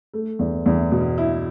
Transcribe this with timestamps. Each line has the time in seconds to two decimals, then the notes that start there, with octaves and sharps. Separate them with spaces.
0.14 A3
0.39 E2
0.66 E2
0.92 B2
1.18 E4